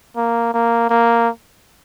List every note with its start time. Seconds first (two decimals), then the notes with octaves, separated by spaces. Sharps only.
0.16 A#3
0.54 A#3
0.90 A#3